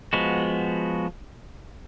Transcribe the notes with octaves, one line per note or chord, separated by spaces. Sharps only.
F3 G#3 B3 F#4